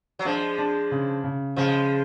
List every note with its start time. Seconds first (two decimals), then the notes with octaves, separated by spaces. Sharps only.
0.19 F#3
0.25 F3 G#3 D4
0.58 D4
0.91 C#3
1.24 C#3
1.56 C#3 F3 G#3